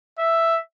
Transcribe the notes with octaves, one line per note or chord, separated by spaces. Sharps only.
E5